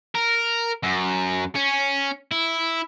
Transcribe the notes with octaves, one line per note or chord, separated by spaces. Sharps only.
A#4
F#2
C#4
E4